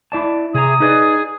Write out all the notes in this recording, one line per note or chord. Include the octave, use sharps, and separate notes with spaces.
E4 D5 A5
C3 G#4 A#5 D#6
D#4 G#4 B4 D5